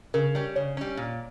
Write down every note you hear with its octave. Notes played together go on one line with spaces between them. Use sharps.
C#3 A#4
G3 C#4
C#3 C#5
G3 C#4
A#2